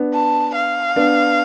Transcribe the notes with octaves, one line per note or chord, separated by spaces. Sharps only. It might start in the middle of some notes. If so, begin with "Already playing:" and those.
Already playing: B3 D4
A5
F5
B3 D4